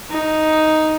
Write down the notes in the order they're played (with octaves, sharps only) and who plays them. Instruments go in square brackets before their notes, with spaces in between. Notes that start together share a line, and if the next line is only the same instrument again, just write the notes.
[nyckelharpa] D#4